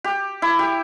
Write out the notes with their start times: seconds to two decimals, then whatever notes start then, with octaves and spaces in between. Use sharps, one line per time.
0.04 G4
0.42 E4
0.59 G4